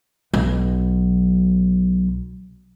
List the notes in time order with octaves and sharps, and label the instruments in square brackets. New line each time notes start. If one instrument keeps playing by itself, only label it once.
[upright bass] B1 F#3